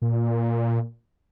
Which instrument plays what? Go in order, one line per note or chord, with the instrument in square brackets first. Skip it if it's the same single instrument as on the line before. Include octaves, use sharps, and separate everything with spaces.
[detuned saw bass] A#2